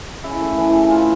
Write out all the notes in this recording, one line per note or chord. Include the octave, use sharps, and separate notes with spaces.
C#3 E4
A3
E3
C#3
C#3 F4